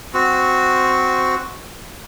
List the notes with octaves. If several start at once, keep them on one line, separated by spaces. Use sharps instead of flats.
C4 F#4